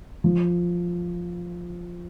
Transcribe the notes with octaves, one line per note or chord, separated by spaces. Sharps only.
F3